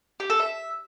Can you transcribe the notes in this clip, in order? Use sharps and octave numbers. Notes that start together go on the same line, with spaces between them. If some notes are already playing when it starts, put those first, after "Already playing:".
G4
A4
E5